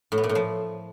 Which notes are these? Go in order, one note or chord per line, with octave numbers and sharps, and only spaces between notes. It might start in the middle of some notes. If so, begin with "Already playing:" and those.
A2
B3
A#2
A2
F3